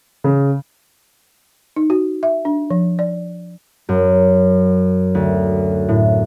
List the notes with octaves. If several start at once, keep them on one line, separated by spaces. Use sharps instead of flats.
C#3
D#4
F#4
E5
D4
F3
D5
F#2
D2
A2